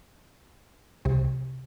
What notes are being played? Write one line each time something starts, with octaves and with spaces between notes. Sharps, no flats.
C2 C3